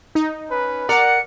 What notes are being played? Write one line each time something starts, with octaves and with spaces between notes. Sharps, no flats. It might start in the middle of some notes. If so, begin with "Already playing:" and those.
D#4
C#4 B4
A#4 D5 F#5 C#7